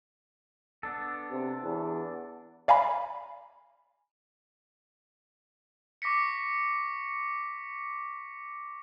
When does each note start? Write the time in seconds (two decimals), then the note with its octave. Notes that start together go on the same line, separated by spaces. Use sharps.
0.83 B3 D4 A4
1.31 C3
1.64 E2
2.68 D5 F5 G#5 A#5 B5
6.02 C#6 D6 A#6 B6 C#7